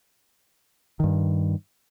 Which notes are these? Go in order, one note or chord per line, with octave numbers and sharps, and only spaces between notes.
G2 D#3